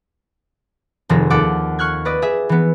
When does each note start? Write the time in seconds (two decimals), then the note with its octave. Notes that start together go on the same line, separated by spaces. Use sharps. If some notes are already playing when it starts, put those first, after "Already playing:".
1.09 F1 D#3 F3 G#4 A4 A#6
1.30 D#2 A4 F#5 D6
1.79 C#6 F6 F#6 G#6
2.05 B4 D5 D#5
2.22 G#4 E5
2.49 E3 B3